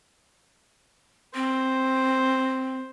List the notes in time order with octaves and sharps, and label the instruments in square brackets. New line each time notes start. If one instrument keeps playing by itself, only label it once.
[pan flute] C4 [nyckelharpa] C5